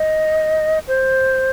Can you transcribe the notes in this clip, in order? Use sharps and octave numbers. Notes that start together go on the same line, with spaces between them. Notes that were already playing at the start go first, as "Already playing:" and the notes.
Already playing: D#5
C5